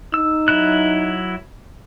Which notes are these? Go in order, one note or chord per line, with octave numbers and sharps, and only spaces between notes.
D#4 E6
F#3 E4 F#6